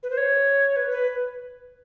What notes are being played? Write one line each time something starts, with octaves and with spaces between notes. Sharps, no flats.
B4
C5
C#5
B4
B4